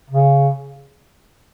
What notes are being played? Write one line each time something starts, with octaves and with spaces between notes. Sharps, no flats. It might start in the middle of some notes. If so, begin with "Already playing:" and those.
C#3